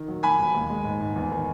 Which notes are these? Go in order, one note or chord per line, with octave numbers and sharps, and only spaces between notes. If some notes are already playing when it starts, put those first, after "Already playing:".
Already playing: D#3
F#3
F#3 G#5 B5
E1
D#2
G#3
G#2
G#2
E2
D#3